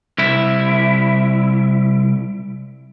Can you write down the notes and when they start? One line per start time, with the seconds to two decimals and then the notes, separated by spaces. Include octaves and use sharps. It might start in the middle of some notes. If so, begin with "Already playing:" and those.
0.18 C2 E4